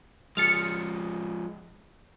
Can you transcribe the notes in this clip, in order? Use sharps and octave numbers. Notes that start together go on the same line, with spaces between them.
F3 G#3 F6 A6 C#7